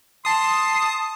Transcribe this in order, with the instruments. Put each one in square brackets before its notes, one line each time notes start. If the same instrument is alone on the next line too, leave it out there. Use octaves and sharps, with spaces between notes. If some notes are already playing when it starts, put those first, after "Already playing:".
[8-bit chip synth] A5 D#6 [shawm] C6